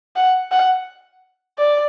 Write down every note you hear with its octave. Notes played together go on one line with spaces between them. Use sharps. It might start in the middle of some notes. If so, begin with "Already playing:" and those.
F#5
F#5
D5